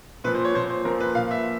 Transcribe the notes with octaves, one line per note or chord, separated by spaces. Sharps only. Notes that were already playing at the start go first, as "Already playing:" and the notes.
A#2 F3 B4
C5
C#5
A#2 F3 C5
C5
A#2 F3 A#4
B4
A#2 F3 F5
E5